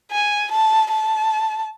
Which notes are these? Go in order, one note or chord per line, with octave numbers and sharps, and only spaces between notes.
G#5
A5
A5